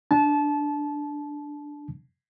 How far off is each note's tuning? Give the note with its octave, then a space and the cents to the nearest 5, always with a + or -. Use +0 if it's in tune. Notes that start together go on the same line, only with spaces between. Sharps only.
D4 +0 A5 -25